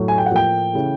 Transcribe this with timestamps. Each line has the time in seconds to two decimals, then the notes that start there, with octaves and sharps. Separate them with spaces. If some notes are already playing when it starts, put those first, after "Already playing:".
Already playing: A2 F#3 A3
0.08 G#5
0.18 G5
0.26 F#5
0.31 A2 F3 A#3 G5
0.73 C#3 E3 A3